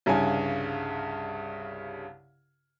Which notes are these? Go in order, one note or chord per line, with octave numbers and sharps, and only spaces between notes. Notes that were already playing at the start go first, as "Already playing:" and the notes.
C2 G2 C#3 G#5